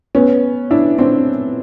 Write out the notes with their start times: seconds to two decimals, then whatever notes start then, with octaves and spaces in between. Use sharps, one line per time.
0.15 B3 C#4
0.71 D4 E4
0.99 C4 D4